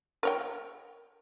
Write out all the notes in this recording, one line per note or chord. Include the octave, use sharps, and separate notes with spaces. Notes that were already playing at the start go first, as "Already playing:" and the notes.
A#4 C#5 G5